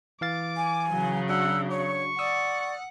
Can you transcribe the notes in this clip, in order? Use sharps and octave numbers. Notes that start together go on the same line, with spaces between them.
E3 F5 D6 A6
G#5
C#3 F#3
D4 F#4 F#5 E6
C#5 C#6
D5 F#5 D#6 E6